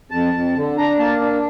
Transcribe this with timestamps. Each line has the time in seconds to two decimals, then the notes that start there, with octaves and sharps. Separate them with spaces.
0.11 F2 A5
0.34 F2
0.56 D3
0.77 D4 A#5
0.99 A#3 A5
1.21 D4